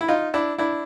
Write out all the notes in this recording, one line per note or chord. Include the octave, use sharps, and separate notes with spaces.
E4
D#4 F4
D4 E4
D4 E4